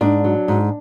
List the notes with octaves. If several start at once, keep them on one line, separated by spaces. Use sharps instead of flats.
G#2 D4
F#3
G#2